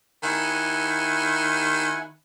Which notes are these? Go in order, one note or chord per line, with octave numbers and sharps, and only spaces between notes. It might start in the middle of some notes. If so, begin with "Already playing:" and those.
D#3 E4 F#5 G#5